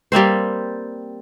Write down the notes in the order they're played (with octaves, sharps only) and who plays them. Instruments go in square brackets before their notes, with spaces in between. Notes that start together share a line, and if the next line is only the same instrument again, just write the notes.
[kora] G3 A#3 C4 C5